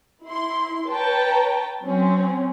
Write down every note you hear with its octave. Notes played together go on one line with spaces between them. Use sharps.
E4 C6
B4 C#5 G5 A5 A#5
F#3 C4 C#4